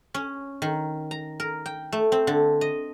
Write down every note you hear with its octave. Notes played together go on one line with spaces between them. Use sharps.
C#4
D#3
A#5
A#4
G5
A3
C4
D3
D#5